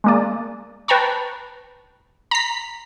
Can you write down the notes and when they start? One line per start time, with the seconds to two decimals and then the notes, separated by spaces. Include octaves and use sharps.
0.04 G#3 A#3 D5
0.88 B4 G5 A5 A#5 C#6
2.31 A#5 B6